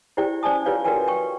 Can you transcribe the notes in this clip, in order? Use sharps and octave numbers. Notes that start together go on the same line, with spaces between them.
E4 G4 C5 D5 G5
C#4 C5 D5 G#5 A5 D#6
F4 G4 B4 C#5 D5 F5
F#4 A#4 B4 D5 G5 G#5
G5 C#6